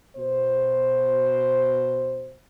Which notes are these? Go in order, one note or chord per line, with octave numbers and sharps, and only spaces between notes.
B2 C5